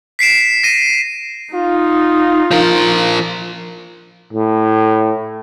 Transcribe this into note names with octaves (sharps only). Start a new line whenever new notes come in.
B6 C7 D7 E7
A#6 D#7
D#4 F4
F3 A#4
A2